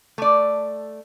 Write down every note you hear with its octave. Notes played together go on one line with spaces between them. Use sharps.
A3 D5